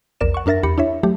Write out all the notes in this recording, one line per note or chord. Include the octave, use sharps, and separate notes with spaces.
A#1 E2 A#4 D5 E7
F#5 C#6
F#2 D4 A#4 E5 A6 A#6
E2 G4 B5 C#7
D4 E4 C#5 E5
F#3 A3 G4